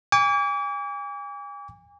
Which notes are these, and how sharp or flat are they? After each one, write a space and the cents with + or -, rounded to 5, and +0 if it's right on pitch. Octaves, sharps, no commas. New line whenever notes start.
G#5 -40 D6 -40